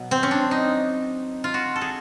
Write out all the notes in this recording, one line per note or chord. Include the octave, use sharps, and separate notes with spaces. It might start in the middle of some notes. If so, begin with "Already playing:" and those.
Already playing: B2 F#3
C4
C#4
D4
D#4
F4
F#4
A4
G#4